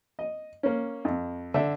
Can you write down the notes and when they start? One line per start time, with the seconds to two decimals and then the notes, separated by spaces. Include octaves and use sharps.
0.19 D#5
0.63 A#3 C#4
1.05 F2
1.54 D3 E5